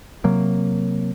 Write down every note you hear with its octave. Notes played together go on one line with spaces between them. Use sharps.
C3 F#3 A#3